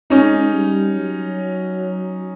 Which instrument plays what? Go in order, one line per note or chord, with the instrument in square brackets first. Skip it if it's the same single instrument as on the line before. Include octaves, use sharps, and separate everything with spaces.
[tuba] G#3 [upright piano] C#4 D#4
[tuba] G3
F#3